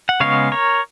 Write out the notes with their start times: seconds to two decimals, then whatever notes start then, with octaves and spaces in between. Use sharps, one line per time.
0.09 F#5
0.20 C#3 G#3 B3 C#5 F5
0.52 A#4 C#5